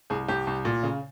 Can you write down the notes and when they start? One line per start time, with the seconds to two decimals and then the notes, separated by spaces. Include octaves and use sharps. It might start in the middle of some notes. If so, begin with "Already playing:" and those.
0.10 C2 G#4
0.28 C2 G4
0.47 C2
0.65 A#2
0.83 C#3